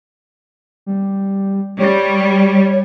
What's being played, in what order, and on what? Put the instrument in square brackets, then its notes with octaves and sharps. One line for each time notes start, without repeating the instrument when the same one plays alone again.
[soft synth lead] G3
[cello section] G3 [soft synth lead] C#5